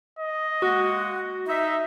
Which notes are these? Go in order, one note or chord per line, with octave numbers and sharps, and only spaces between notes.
D#5
G#3 A#3 F#4 F#5
D#4 E5